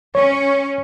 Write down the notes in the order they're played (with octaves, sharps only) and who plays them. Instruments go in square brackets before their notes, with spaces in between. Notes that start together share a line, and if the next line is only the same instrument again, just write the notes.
[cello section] C#4 [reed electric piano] C#5